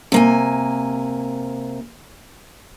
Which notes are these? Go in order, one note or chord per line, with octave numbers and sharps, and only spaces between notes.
C3 A#3 G#5